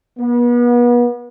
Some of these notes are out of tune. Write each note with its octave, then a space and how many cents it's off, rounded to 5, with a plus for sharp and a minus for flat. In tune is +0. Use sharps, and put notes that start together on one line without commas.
B3 -35